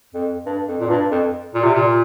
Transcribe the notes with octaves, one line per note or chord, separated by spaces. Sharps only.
F2
G2
F2
A#2
G2
F2
A#2
C3
A#2